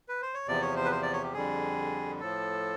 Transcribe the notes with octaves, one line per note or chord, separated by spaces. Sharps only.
B4
C5
C#5
E2 C3 F3 D5
C#5
C5
B4
C5
D5
C#5
G4
F2 D3 G3 G#4
A2 F3 A4